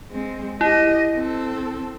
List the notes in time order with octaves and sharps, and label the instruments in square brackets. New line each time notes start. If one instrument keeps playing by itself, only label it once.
[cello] G#3 C4
[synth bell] E4 [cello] G4 D#5
[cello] C4 A4